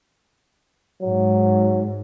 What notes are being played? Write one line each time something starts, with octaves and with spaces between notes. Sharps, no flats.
G#2 F#3